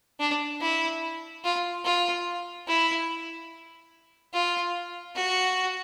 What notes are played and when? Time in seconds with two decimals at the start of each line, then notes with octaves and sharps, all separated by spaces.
0.20 D4
0.61 E4
1.45 F4
1.85 F4
2.68 E4
4.33 F4
5.16 F#4